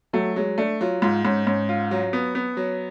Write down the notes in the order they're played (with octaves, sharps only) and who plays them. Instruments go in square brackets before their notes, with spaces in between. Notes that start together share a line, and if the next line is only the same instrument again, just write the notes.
[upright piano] F#3 [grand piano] A3
[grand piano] F#3 [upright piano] G#3
[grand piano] A3 [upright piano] D4
[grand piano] F#3 [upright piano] F4
[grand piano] G#2 [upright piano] F4
[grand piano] G#2 [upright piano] C#4
[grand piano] G#2 [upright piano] C#4
[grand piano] F4
F#3
B3
B3
F#3